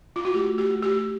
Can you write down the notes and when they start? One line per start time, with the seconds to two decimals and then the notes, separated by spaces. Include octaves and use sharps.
0.16 F4
0.25 F#4
0.34 A3 G4
0.58 G4
0.70 A3
0.82 G4